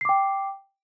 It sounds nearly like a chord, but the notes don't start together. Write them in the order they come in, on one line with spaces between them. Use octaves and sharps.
C7 D6 G5